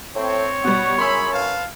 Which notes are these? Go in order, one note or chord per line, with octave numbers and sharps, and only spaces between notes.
A2 C4 C#5
B2 G3 F#4
F#2 G#4 B5 C6 E6
B4 F5 A5